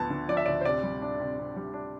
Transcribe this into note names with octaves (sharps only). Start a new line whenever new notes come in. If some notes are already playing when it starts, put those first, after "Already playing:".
Already playing: D2 F3 B3 A5
D3
F3 D5
E5
D2 D5
C5
C3 D5
G3
D4
C3
C3
G3
D4